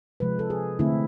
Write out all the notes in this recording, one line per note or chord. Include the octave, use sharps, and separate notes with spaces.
C3 F3 G#3 B4
A4
G#4
D3 A3 C4 E4